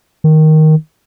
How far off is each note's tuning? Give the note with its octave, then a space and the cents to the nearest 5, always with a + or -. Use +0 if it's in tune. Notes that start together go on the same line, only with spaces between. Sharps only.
D#3 +5